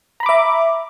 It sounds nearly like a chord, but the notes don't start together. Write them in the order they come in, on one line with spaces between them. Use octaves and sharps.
A#5 B5 D6 E5